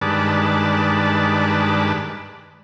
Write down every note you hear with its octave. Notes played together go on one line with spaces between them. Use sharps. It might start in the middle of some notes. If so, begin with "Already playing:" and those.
G2 D#3 G#3 B4 D5 A5